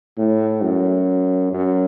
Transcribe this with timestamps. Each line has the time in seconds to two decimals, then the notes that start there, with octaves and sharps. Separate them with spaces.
0.17 A2
0.63 F#2
1.53 F#2